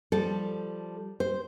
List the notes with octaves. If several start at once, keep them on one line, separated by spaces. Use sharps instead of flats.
F3 G3 A4
C5